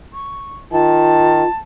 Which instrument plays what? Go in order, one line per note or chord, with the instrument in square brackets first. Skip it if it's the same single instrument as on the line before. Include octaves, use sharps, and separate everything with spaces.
[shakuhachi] C#6
[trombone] D#3 [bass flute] F4 [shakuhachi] A5